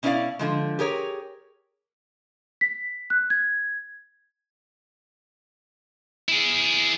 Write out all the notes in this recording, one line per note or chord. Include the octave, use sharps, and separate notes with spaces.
B2 C#4 E4 C#5 D5 F5
D3 F3 G#3
G4 G#4 A#4 C#5
B6
F#6
G#6
E4 G#4